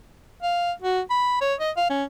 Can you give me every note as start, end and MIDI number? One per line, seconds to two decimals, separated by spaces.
0.43 0.72 77
0.82 1.01 66
1.10 1.37 83
1.41 1.54 73
1.60 1.71 75
1.77 1.90 77
1.90 2.04 61